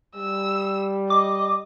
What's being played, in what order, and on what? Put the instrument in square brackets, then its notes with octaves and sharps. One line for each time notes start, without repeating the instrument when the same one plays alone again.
[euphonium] G3 [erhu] E6
[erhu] D#5 [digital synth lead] D6